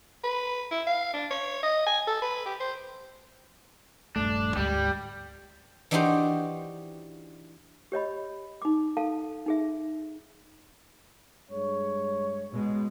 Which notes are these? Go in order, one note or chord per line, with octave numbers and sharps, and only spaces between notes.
B4
E4
F5
D4
C#5
D#5
G#5
A4
B4
G4
C5
D#1 G2 A3 D4
D2 G#2 G3
E3 D4 D#4 F#4 G4 C5
G4 C#5 D#5 B5
D#4 D6
A4 F5 A5
D#4 G#4 E5
G2 G#3 C#5
B2 G#3